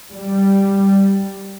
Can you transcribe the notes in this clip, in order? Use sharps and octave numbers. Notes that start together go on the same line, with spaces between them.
G3